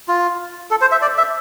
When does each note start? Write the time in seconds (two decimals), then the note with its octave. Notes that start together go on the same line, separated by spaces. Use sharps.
0.08 F4
0.71 A4
0.81 C5
0.92 E5
1.02 D5
1.18 E5